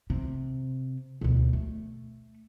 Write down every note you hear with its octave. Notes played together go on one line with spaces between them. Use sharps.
C3
D2 B2
A3